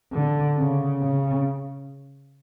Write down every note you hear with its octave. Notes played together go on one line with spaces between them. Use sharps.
D3
C#3
C#3